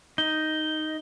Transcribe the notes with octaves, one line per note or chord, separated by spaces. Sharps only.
D#4 G7